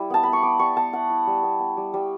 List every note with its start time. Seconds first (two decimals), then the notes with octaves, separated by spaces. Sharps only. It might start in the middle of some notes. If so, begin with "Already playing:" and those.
Already playing: G3 E4
0.10 B3 A5
0.23 B3 B5
0.33 C#6
0.43 B3 D6
0.59 G3 C#6
0.77 B3 A5
0.93 E4 F#5
1.10 E4
1.27 G3
1.43 B3
1.59 B3
1.77 G3
1.94 G3